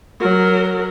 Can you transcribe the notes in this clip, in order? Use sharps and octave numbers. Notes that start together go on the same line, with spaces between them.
F#3 A#4